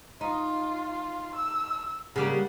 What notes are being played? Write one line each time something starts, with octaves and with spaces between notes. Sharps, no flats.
D#4 F4
E6
C#3 G3 A#3 F#5